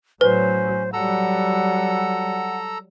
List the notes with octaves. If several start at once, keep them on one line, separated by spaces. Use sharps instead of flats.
A2 F#3 C#4 B4 C5
F#3 G3 A4 F#5 A#5 E6